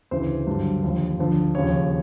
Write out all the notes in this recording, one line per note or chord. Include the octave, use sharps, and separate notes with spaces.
D2 C#3 E3 C5
G2 D3 F#3
D#2 D3 F3
D2 D3 F3
D#2 C#3 F3 C#5